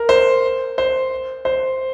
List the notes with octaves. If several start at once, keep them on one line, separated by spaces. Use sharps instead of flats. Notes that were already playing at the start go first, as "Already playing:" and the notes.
Already playing: A#4
C5
C5
C5